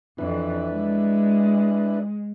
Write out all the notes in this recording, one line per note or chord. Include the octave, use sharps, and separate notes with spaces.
F2 E3 D4 E4 B4
G#3